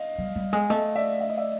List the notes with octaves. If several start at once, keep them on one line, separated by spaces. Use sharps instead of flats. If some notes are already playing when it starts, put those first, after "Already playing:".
Already playing: D#5 F5
G3
G3
G#3
A3 D#5
D5 E5
E5
D#5
D5 E5